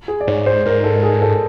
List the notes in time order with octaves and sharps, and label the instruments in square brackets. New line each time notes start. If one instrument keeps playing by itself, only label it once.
[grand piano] G#4
D5
[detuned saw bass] G#2 [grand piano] C#5
[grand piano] C5
[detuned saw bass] G#2 [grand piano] A#4
[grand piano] A4
G#4
A4